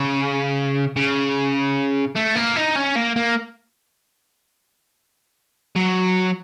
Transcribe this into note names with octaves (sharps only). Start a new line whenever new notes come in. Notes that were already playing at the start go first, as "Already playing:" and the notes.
Already playing: C#3
C#3
A3
A#3
D#4
C#4
A#3
A#3
F#3